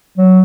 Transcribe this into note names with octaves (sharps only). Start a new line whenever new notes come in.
F#3